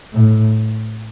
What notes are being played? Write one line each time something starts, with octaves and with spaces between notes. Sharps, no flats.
A2